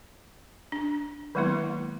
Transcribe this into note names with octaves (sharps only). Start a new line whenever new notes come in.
D4
D#3 F#3 G#3 A#3 B3 E4